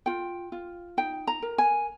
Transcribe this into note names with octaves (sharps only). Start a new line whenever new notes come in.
F4 G5
F4
D#4 G5
A#5
A#4
G#5